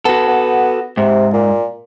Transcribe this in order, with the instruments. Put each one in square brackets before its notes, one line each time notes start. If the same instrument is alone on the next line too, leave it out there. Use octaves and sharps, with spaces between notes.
[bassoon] B3 [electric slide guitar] F#4 A4
[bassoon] B3
[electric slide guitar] G#2 [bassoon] C3
[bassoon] A#2